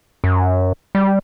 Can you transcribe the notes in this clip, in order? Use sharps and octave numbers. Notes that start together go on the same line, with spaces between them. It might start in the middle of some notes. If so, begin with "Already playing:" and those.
F#2
G3